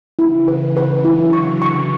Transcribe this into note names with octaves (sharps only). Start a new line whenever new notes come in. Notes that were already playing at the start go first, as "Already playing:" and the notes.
C#3 E3 E4
B4
C#3 E3
B4
D3 F#3 E4
C#6
C#6